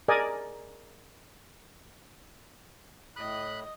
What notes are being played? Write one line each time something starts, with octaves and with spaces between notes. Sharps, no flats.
G#4 A#4 D5 D#5 G#5
A2 D#5 B5 F#6